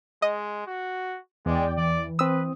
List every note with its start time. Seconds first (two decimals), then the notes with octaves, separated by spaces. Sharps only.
0.22 G#3 D#5
0.67 F#4
1.46 E2 G#3 D5 G5
1.77 E3 D5
2.19 C4 B4 D#6 E6